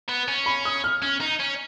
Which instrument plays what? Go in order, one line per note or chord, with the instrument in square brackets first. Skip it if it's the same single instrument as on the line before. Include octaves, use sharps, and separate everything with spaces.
[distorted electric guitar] B3
C#4
[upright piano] B5
D#6
F6
[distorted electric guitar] C#4 [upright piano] F6
[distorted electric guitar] D#4
C#4